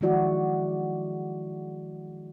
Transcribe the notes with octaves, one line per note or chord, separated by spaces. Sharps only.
D#3 F3 G#3 E4 F#4 D5